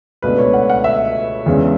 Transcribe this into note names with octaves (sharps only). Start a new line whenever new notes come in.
C#2 B2 A3 D4 B4
C#5
F#5
F#5
E5
E2 C#3 G#3 D4